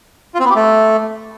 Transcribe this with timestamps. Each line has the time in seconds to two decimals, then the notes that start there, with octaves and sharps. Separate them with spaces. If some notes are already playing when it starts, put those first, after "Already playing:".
0.34 F4
0.40 C4
0.45 B3
0.50 G4
0.55 A3